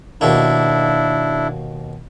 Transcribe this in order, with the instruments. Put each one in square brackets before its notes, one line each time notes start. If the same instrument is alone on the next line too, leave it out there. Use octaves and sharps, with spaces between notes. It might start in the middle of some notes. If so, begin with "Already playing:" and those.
[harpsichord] D#2 B2 A#3 [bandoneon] D4 E4